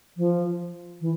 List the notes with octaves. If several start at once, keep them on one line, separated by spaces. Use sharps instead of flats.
F3
E3